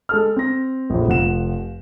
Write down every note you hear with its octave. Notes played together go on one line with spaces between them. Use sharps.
G#3 A4 F6
C4 A#6
A#1 F2
F1 F3 F#5 E7